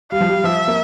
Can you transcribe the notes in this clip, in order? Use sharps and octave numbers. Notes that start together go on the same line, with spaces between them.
G3 F5
F3
G3
F3 E5
A#3